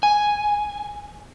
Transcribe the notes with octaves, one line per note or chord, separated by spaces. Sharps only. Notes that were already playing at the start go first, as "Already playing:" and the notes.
G#5